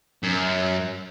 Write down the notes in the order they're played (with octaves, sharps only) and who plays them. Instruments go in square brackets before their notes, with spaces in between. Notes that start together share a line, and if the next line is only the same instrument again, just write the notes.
[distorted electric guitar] F#2